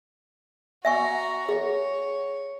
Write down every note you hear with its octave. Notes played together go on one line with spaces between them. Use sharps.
F#4 E5 G#5 A#5 C#6
G#4 C#5